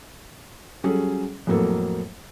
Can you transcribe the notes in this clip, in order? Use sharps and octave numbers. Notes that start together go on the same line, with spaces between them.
F#3 G3 C#4 G#4 A4
F2 A2 F#3 A#3 A4